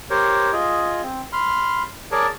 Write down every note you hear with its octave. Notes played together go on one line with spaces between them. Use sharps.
G4 A#4 C5 C#5
F4 G#4 D#5
C4
B5 C6 F6
G#4 A#4 C#5 D5 A5